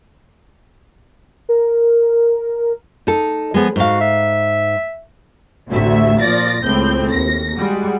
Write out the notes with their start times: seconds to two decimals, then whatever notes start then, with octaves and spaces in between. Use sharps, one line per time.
1.49 A#4
3.07 D#4 A4
3.54 F3 G#3 B3
3.76 G#2 F#4 F5
4.00 E5
5.70 A1 D2 C3 F#4 E5
6.21 A#2 F3 D5 A6 A#6
6.64 C#2 A2 C4 G6
7.11 D#2 A#6
7.59 G3 G#3 F#4